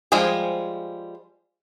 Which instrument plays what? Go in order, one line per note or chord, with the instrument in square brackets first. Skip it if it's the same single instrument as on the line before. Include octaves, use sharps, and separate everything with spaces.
[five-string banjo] F3 G3 G#3 G#4 C5